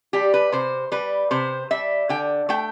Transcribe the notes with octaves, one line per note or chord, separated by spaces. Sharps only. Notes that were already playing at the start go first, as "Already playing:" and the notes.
G3 G4
B4
C3 C5
G3 B4
C3 C5
G3 E5
D3 G5
A3 G5